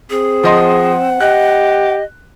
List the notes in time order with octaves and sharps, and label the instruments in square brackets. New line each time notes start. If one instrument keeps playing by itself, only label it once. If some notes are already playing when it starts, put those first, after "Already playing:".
[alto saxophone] C4 [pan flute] G#4
[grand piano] F3 D#5 C6 [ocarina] F#5
[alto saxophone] G4 [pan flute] D#5 [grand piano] F#6